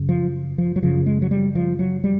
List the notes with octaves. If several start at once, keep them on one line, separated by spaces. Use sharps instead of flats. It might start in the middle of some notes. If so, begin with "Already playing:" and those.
Already playing: F#2 C#3
F3
F3
F#3
F#2 C#3 F3
G#3
F#3
G3
F3
F#3
G3